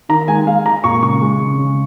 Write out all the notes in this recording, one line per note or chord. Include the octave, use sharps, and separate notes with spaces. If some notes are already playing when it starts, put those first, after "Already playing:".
D#3 A#5
G#3 G#5
G#3 F5
G#3 A#5
A#2 C#6
C#3 C#6
G#3
C#3
C#3